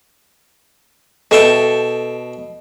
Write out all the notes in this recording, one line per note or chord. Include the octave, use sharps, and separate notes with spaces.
B2 A4 E5 G5